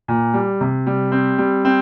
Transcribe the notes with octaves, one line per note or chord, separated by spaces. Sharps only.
A#2
G3
C3
G3
C4
G3
C4